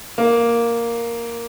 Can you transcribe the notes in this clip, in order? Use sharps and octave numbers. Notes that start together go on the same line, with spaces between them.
A#3